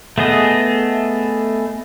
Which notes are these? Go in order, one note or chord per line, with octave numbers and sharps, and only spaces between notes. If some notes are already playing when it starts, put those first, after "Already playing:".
A3 B3 G#4 D#5